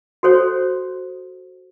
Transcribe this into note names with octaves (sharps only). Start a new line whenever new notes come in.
F#4 A4 C5 C#5